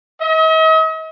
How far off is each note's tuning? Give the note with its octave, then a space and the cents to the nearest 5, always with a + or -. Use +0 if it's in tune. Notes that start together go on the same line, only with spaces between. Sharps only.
D#5 +45